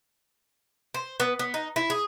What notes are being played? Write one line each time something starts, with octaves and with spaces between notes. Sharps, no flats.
C5
B3
B3
D#4
E4
G#4